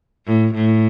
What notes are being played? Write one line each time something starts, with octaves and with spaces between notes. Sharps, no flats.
A2
A2